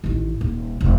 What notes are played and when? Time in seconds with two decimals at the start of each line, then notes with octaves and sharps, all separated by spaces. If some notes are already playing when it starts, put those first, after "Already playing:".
0.04 A1 D#3
0.41 D#1
0.81 E1 F2